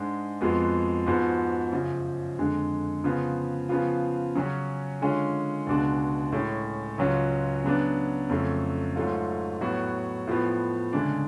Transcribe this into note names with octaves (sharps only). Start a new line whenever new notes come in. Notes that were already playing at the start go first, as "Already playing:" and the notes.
Already playing: G#2 G#3 D4
F2 F3 G#3 B3 F#4
G#2 F3 B3 F#4
F#2 C#3 F3
F2 D3 G#3
C#3 F3 B3 F4
C#3 F3 B3 F4
C#3 F#3 C#4
D3 G#3 C#4 F4
C#2 B2 G#3 D4 F#4
A2 G#3 C#4
C#2 C#3 F#3 C#4 F4
C#3 F#3 B3 D4
F2 C#3 F#3 A3
G#2 F#3 A3 F4
A2 F#3 B3 F#4
A2 F3 B3
D2 C#3 G#3 D4